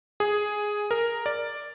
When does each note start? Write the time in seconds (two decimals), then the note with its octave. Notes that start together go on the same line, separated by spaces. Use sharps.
0.20 G#4
0.91 A#4
1.26 D5